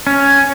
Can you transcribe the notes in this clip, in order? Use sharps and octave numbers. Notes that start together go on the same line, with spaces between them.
C#4